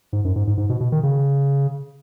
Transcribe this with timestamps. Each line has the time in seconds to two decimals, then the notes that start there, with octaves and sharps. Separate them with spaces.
0.13 G#2
0.25 F#2
0.36 G#2
0.47 G#2
0.57 G#2
0.69 B2
0.80 B2
0.92 D#3
1.03 C#3